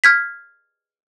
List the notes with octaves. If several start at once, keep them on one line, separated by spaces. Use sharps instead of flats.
F6 G#6 B6